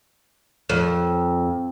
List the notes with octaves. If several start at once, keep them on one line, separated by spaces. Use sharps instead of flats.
F2